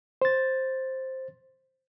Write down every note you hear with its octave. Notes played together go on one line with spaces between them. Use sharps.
C5 A6